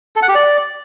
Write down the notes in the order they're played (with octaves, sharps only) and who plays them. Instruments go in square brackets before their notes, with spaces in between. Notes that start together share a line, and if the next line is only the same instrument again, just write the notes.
[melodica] A4
F#5
G4
D5